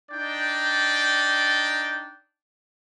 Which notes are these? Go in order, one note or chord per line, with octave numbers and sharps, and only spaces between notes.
D4 D#4 D5 G5